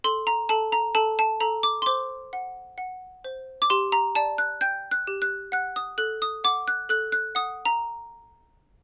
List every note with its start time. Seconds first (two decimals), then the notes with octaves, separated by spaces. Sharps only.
0.04 A4 C6
0.27 A#5
0.49 A4 A5
0.72 A#5
0.95 A4 A5
1.19 A5
1.40 A4 A#5
1.63 D6
1.82 C6
1.86 C5 D6
2.33 F#5
2.78 F#5
3.24 C5
3.62 D6
3.70 G4 C6
3.92 A#5
4.15 D5 A5
4.38 F#6
4.61 G5 G6
4.91 F#6
5.07 G4
5.22 F#6
5.52 F#5 F#6
5.76 D#6
5.98 A4 F#6
6.22 D#6
6.44 F#5 D6
6.68 F#6
6.89 A4 F#6
7.12 F#6
7.35 F#5 D#6
7.65 A#5